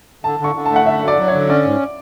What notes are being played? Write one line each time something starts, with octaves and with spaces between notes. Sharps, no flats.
D3 A5
D3 C#6
D3
A5
A3
F#5
D3 E5
F#3
D5
F#3
C#5
D3
C#4 D5
G#2